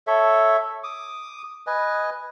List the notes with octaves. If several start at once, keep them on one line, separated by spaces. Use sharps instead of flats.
A4 C#5 E5
D6 D#6
B4 D#5 G#5